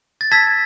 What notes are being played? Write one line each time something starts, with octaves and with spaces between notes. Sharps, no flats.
A6
A5 E6 G#6 B6